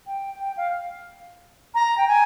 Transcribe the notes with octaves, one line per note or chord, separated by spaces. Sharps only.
G5
G5
F5
A#5
G5
G#5